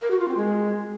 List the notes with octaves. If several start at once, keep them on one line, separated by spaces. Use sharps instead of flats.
A#4
F#4
F4
C4
G#3